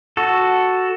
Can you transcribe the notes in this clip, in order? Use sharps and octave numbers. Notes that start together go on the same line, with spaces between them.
F#4 A4